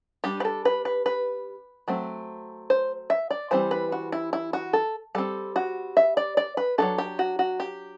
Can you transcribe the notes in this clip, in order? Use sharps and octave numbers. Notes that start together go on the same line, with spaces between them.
G3 D4 G4
B4
A4
B4
B4
B4
F#3 A3 C4
C5
E5
D5
E3 G3 C4 C5
B4
F#4
E4
E4
F#4
A4
G3 C4 A4
F#4
E5
D5
D5
B4
F#3 A3 D4 A4
G4
F#4
F#4
G4